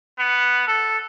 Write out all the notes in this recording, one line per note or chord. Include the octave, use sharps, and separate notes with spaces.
B3
A4